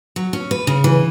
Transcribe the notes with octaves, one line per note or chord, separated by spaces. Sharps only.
F#3
C#4
B4
C#3
E3